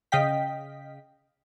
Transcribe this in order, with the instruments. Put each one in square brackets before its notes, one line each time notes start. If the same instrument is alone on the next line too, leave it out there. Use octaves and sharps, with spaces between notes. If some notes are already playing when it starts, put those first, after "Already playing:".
[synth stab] C#3 D#5 F5 G5 B6